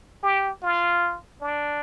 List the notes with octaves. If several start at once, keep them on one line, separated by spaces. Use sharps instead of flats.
G4
F4
D4